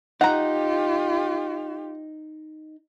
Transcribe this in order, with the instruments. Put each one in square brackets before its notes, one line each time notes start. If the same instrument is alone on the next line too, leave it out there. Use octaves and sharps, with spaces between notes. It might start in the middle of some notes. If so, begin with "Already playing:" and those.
[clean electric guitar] D#4 [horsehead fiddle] F4 G4 [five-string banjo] F#5 A#5